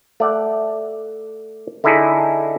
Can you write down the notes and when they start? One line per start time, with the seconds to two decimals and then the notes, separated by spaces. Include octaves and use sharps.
0.20 A3 D5 F#5
1.84 D3 D#4 E4 G#4 A4